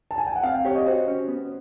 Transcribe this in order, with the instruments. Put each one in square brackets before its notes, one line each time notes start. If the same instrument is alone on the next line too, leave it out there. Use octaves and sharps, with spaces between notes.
[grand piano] A5
G#5
G5
F#5
[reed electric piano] C4 [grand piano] F5
[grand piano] G5
[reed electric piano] G4 [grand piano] C#5
[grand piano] D#5
[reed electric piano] F#4 [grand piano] C5
[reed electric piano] C#4
B3